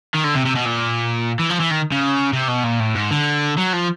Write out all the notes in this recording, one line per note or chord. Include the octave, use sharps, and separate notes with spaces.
D#3
D3
C3
C3
B2
A#2
E3
F3
E3
D#3
C#3
C3
B2
A#2
A2
G#2
D3
F#3
F3